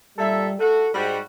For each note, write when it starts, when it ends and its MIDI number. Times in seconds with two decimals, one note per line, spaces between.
0.18 0.49 46
0.18 0.56 55
0.18 0.49 69
0.18 0.49 76
0.59 0.87 57
0.59 0.87 66
0.59 0.92 69
0.95 1.18 44
0.95 1.18 55
0.95 1.18 66